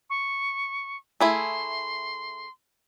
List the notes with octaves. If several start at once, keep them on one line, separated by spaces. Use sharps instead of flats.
C#6
A3 E4 G#4 C6